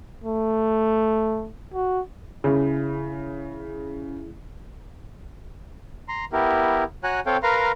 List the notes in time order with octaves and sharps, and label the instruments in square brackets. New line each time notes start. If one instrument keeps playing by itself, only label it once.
[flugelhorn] A3
F#4
[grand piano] C#3 [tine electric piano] E4 G#4
[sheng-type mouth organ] A#5 C6
B3 E4 G4 A#4
F#4 C#5 F#5 G#5 A#5 F#6
C4 A4 C#5 F5 G5
A#4 B4 F5 A#5 C6